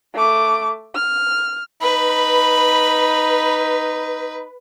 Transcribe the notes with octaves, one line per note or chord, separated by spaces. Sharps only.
A3 D6
F6
D#4 B4 B5